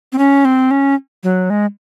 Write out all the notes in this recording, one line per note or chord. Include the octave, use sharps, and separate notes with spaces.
C4
C#4
C4
C#4
F#3
G#3